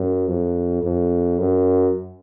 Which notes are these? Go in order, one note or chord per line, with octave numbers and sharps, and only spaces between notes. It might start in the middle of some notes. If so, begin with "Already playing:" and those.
Already playing: F#2
F2
F2
F#2